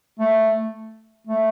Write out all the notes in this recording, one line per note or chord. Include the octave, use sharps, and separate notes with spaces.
A3
A3